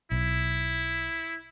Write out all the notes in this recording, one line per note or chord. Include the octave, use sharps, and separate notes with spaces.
B1 E4